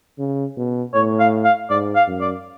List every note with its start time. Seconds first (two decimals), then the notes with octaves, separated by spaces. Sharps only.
0.19 C#3
0.57 B2
0.94 A2 C#5
1.20 F5
1.45 F5
1.70 G#2 D5
1.95 F5
2.08 F#2
2.21 D5